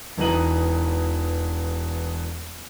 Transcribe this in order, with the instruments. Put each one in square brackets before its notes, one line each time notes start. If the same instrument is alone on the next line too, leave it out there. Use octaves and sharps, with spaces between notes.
[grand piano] E1 E3 D#4 A#5 D#7 F#7